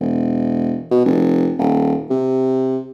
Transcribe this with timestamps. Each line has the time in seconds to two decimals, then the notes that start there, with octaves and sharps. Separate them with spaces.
0.01 E1
0.91 B2
1.05 F1
1.59 D#1
2.10 C3